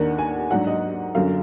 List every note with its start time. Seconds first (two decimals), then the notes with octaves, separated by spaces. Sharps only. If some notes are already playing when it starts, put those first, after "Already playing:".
Already playing: D#2 D#3 A#3 D4 F#5
0.18 G#5
0.51 G#2 F#3 D4 F#5
0.67 D#5
1.15 F#2 D3 F#3 F5